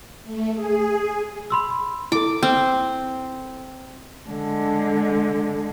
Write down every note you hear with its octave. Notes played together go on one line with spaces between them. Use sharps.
A3
G#4
B5 C6 E6
E4 A4 D6
C4
D3 G#3